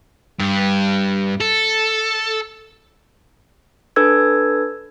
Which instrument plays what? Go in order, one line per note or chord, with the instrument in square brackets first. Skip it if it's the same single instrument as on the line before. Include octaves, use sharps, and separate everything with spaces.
[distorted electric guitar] G2
A4
[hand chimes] D4 A4 B4 E6 G#6